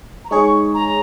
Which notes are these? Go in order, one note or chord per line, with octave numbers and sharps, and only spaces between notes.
A#5
G#3 D#4 G#4 C#5 C#6
A#5